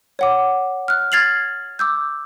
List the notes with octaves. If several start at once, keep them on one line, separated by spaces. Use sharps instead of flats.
C#5 F#5 D6
F6 F#6
F6 G#6 A6 C7 F7 F#7
D6 E6 G6